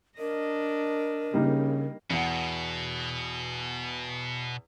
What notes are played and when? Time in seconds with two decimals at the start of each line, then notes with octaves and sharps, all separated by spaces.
0.18 D4 A#4 D#5
1.34 C#3 G3 A#3 D#4
2.10 E2 B2 F#5